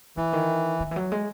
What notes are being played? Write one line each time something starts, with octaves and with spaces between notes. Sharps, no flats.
C#3 E3
D#3
D#3
E3
F#3
G#3